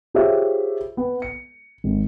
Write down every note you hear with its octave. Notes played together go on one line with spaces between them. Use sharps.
F4 G4 G#4 C5 C#5 E5
B3
C#7
G#1